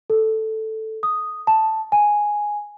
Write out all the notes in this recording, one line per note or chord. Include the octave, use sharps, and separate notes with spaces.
A4
D#6
A5
G#5